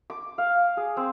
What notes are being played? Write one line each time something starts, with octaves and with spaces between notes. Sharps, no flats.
D6
F5
G#4
C4